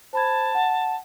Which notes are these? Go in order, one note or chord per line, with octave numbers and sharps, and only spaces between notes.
C5 A5 B5 G#6
F#5